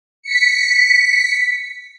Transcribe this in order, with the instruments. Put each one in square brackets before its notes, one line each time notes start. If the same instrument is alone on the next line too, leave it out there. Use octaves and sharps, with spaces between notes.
[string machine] B6 C#7